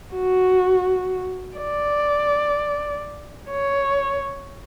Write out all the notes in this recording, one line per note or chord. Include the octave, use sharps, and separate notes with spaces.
F#4
D5
C#5